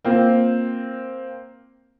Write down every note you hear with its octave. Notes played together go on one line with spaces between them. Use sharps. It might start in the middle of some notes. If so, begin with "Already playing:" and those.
A#3 C4 F4